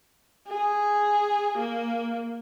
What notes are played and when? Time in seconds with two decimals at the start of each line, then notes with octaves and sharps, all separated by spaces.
0.47 G#4
1.58 A#3